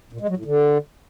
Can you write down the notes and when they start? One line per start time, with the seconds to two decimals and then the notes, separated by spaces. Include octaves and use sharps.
0.12 A#2
0.21 G#3
0.29 F#3
0.37 A2
0.45 D3